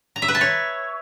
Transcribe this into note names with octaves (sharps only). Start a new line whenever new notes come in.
A#5
E5
B4
A5
C#5